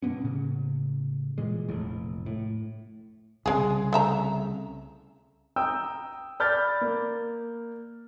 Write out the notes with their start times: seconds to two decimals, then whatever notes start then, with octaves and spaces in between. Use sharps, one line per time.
0.02 B2 A#3 B3 C#4
0.22 A2 C#3
1.38 A#2 E3 G#3
1.69 F1 A#1 A2
2.26 A2
3.46 C2 C#3 G#3 G#4
3.93 A3 E5 A#5
5.56 G5 A#5 D#6 E6 G6
6.40 D5 B5 F6 G6 A6
6.81 A#3